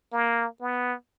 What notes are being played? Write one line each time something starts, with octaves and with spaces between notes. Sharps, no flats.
A#3
B3